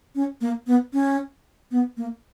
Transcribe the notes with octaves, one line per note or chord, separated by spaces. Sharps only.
C#4
A#3
B3
C#4
B3
A#3